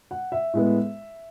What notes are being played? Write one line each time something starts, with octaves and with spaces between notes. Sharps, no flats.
F#5
E5
A2 G#3 B3